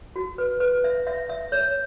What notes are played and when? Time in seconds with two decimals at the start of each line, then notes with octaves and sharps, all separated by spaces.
0.16 F#4
0.38 B4
0.60 B4
0.84 E5
1.07 E5
1.29 E5
1.52 C#5